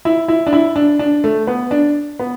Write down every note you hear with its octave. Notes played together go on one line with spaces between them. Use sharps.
E4
E4
D4
E4
D4
D4
A3
B3
D4
B3